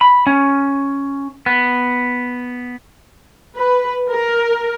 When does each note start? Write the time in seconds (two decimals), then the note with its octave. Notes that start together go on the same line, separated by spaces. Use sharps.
0.01 B5
0.27 C#4
1.46 B3
3.55 B4
4.10 A#4